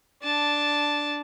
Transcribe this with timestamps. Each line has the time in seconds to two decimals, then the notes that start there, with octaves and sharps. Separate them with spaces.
0.23 D4 A5